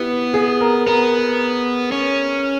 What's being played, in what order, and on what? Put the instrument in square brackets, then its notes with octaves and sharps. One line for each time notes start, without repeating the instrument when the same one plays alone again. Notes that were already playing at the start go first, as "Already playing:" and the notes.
Already playing: [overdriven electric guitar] B3 [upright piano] E4 G4
[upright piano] G#4
A#4
[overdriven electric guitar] B3 [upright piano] A#4
[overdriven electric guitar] C#4